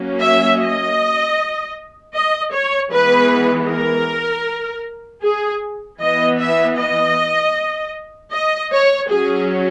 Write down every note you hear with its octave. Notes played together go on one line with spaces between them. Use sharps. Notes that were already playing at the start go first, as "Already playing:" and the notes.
Already playing: F#3 A#3 C#4
E5
D#5
D#5
C#5
E3 G#3 B3 B4
A#4
G#4
E3 B3 D#5
E5
D#5
D#5
C#5
F#3 C#4 G#4